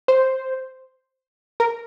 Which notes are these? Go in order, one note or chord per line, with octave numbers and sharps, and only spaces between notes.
C5
A#4